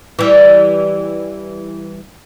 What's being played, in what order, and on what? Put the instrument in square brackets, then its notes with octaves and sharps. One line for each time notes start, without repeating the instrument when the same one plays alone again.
[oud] E3 G3